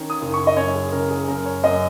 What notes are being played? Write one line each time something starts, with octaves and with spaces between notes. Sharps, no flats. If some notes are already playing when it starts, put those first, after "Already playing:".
Already playing: D#3 C#4
D#6
F#1
C#6
D#5
F#2 C#5
G#4
C#3 A#4
G#4
F#2 A#4
C#5
F#2 D#5